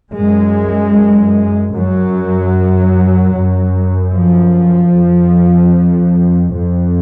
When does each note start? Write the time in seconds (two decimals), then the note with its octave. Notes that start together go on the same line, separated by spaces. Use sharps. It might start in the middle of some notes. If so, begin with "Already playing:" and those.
0.15 F#2 G#3
1.74 F#2 F#3
3.34 F#2
4.14 F3
4.94 F2
6.53 F2